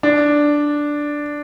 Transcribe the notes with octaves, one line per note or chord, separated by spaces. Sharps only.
D4